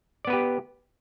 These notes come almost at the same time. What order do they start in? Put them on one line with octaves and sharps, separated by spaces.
D5 B3 B4 G4